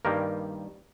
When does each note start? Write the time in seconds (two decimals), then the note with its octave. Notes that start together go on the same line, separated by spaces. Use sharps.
0.05 G2 D#3 G3 A#3 A#4